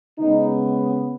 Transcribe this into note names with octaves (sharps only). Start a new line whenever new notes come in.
C#3 G#3 B3 D#4